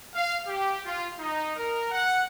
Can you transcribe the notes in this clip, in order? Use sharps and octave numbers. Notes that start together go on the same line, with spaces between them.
F5
G4
F4
D#4
A#4
F#5